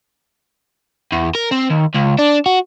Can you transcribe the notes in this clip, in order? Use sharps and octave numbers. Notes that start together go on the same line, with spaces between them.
E2
A#4
C4
D#2
C#2
D4
F#4